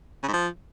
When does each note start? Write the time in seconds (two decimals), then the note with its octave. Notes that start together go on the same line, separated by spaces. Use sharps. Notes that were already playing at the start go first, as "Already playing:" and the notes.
0.23 C#3
0.28 G#2
0.33 F3